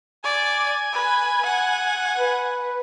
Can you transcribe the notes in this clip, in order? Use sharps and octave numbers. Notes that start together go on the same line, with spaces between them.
D5 G#5
B4
F#5
B4